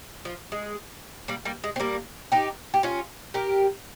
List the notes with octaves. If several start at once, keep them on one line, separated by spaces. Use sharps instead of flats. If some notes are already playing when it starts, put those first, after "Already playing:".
F3
G#3
G3 A#3
G3 A#3
G#3
C4
G3 A#3
D#4 G4
G4
C#4 F4
G4 A#4